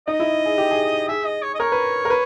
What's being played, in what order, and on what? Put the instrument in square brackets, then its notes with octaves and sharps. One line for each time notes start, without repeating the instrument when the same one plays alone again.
[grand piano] D#4 [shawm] D#5
[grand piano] E4
G#4
G4
G#4
[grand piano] G#4 [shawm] E5
[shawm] D#5
C#5
D#5
[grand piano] A#4 [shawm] C#5
[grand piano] B4
A#4
B4